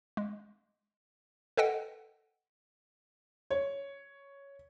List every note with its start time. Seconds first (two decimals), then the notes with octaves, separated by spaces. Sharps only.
0.17 G#3
1.57 A4 B4 D#5 F#5 G5
3.50 C#5